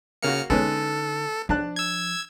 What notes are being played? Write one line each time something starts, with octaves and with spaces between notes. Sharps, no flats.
C#3 A#3 F#4 F6 C#7
D3 G#3 B3 C#4 D#4 A4
F3 D4 A5 F#6
E6 G#6